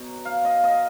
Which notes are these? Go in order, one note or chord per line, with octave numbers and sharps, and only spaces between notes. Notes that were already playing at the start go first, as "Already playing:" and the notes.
Already playing: B2 F#3
F5
D#5
D#5